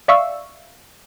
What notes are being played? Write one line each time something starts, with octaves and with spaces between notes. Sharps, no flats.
D5 E5 F5 C#6 E6